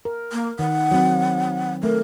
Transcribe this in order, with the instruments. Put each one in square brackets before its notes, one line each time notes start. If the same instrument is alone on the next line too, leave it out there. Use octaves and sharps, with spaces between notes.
[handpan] A#4
[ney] A#3
[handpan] D#3 [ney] F#5
[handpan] F#3 C4
[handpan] A3 [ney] A#4